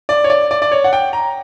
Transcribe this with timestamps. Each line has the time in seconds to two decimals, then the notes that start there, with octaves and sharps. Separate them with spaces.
0.09 D5
0.24 C#5
0.30 D5
0.51 D5
0.62 D5
0.72 C#5
0.84 F#5
0.93 G5
1.13 A#5